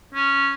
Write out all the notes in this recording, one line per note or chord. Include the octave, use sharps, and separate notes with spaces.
C#4